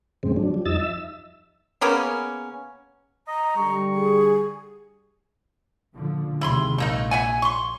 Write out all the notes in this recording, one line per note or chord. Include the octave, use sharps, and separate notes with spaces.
F#2 A2 C#3 G#3 C4
F#3 D4
F3 G3
F2 D#4 D#5 E6 A6
E5 E6
C#3 A#3 B3 C#4
D#5 A#5
D3 G3 C#6
G#4
A#2 D3 F3
D#2 C3 G#3 E4 B5 C6
A#1 A3 A#3 D#4
E5 F#5 G#5
C6 C#6